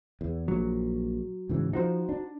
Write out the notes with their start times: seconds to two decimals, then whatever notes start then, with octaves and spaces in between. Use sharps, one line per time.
0.21 E2
0.48 A#1 F#3
1.49 G#2 C#3 E3
1.73 F3 D#4 F#4 C5
2.09 D4